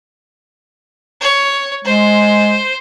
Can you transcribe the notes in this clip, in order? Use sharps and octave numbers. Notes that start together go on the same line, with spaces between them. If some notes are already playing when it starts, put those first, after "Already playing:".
C#5
G#3 C5